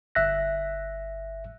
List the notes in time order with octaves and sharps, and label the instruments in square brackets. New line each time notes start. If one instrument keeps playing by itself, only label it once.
[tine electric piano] G1 E5 F#6 A#6